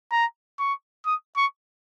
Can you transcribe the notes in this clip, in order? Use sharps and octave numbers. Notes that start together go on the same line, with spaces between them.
A#5
C#6
D#6
C#6